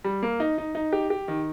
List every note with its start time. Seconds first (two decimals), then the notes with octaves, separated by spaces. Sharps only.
0.04 G3
0.23 A#3
0.40 D#4
0.58 D#4
0.75 D#4
0.92 G4
1.10 G4
1.28 D#3